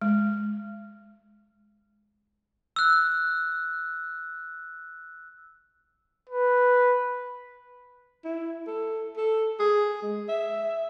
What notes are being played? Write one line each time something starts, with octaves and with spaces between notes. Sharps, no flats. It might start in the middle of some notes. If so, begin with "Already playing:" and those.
G#3
E6 F#6
B4
E4
A4
A4
G#4
G#3
E5